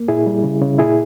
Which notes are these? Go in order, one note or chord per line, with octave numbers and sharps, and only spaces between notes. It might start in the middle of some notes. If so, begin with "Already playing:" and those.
Already playing: A#3
A#2 E4 G#4
G3
C#3
C#3
A#2 E4 G#4